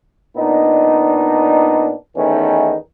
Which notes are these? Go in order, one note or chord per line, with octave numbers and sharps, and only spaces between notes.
A#2 B3 D4 D#4
E2 D#3 A3 B3 C#4 D#4